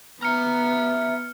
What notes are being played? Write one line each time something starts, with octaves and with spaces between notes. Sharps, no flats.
B3 E5 A#5 F6 C#7